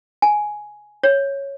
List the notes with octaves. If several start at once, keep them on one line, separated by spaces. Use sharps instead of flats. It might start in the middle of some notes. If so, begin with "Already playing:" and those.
G#5
C#5